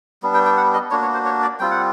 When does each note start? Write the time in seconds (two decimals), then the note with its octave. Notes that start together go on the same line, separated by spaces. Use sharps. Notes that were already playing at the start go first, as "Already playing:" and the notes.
0.23 G3 B3 D4
0.34 G5
0.46 G5
0.57 F#5
0.74 D#5
0.91 A#3 D4 F#4 C#5
1.02 C#5
1.14 C5
1.25 C#5
1.42 D5
1.59 G3 C4 F4 G5
1.71 F#5